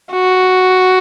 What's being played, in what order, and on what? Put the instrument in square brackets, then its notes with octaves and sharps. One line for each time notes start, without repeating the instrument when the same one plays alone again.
[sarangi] F#4